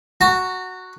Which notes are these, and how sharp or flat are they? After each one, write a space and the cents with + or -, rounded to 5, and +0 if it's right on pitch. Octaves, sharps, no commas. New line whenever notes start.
F#4 +0 A#5 -30